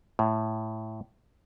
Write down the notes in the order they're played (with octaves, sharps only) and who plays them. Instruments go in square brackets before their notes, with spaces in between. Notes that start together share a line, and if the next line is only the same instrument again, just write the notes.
[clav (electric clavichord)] A2